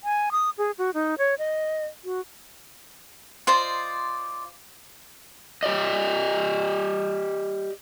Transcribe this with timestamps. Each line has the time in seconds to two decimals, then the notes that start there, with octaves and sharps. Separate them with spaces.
0.04 G#5
0.32 D#6
0.58 G#4
0.78 F#4
0.94 D#4
1.18 C#5
1.39 D#5
2.04 F#4
3.47 F4 C5 D5 D#5
5.63 G4 D5 D#5